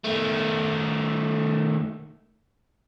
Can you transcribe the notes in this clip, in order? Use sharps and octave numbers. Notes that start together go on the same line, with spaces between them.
D#3 A3